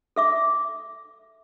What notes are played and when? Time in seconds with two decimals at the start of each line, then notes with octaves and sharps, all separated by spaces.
0.16 A4 E5 D6